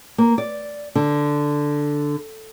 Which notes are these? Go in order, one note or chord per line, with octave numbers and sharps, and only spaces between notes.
A#3
D5
D3